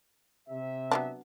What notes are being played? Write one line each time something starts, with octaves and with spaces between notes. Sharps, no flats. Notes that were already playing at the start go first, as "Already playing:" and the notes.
C3 E5
F#3 B3 D4